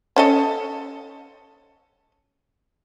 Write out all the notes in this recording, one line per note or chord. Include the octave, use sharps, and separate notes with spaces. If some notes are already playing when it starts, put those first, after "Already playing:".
C#4 A4 D#5